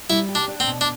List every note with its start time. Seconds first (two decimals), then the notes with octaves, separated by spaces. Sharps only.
0.09 G3 E4
0.29 G4
0.35 D4
0.48 D4
0.60 C4
0.67 B2
0.81 D4